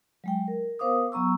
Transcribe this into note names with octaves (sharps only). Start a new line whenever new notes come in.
F#3 G#3 G5
A#4
B3 A#4 C5 F5 D6 D#6
F#3 B3 A#5 C#6 E6